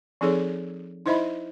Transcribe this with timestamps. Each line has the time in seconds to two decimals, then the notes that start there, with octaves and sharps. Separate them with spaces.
0.21 F3 C4 D#4 G#4 A4 C#5
1.06 D#4 E4 C5 D#5 E5 B5